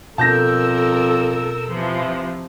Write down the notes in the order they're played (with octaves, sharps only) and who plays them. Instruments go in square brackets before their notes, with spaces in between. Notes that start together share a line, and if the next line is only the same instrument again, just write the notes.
[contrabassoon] F2 [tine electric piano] B2 G6 [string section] A4 A#4 E6 [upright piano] A5 A#6
[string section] C3 E3 F3